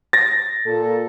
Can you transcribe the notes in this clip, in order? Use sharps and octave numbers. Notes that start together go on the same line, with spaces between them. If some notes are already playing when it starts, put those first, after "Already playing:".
A6 A#6
A#2 A4